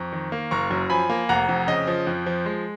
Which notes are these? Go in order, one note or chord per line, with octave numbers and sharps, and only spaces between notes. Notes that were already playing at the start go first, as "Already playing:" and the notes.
Already playing: F2 A#5 C#6
D#3
A#3
F#1 A#5 C#6
F#2
F3 G#5 B5
A#3
F1 F#5 A#5
F2
C#3 D#5
F3
F2
F3
G#3